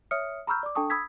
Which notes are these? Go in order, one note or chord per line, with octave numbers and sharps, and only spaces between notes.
C#5 E5 D#6 F6 C#7
A#5 B5 C#6 E6 F6 G6
D5 D6
D4 A4 G5 A5 C#6 D#6
B5 D#6 E6 G#6 B6